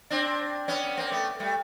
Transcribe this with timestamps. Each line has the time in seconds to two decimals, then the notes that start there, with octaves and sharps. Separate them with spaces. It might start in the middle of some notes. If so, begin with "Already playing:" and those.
0.10 C4 D4
0.68 B3 C#4
0.97 A#3 C4
1.12 A3 B3
1.40 G3 A3